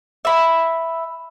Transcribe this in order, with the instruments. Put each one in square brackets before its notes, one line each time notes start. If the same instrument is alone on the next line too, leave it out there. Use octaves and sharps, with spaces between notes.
[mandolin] E5 B5